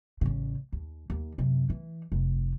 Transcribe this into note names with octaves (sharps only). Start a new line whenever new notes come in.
A1 C#3
D#2
D#2
F#2 C3
E3
F1